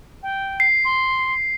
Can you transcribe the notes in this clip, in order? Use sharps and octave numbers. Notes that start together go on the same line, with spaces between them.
G5
C7
C6